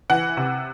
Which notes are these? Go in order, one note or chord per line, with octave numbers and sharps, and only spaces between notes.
E3 F#5
C3